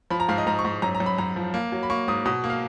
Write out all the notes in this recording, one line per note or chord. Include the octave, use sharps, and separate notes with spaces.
F3 B5
A#5
G#2 F5
D#5
G#2 A#5
C#6
G#2
F#2 A#5
A#5
F#2
B5
F#2 A#5
F3
A#3
F#3
B5
A#3 C#6
G#2 D#6
B2 D#6
A#3
F5